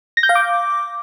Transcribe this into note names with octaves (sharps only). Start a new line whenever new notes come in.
A#6
G6
F5
D6